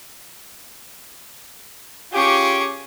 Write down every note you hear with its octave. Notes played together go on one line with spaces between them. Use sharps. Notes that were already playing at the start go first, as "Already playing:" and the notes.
C#4 F4 G4 G#4 C#6